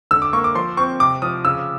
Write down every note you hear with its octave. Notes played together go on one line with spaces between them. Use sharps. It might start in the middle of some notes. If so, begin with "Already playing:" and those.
D3 E6
D6
A#3 C#6
D6
F3 C6
C4 C#6
C3 D6
F3 D#6
C#3 E6